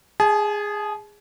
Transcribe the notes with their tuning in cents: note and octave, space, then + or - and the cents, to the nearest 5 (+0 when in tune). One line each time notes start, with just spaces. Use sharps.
G#4 -10 A5 -45